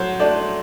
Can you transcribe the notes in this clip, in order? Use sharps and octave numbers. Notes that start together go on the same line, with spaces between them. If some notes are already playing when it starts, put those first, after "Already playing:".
Already playing: F#3 A3 C5
A3 D4 D5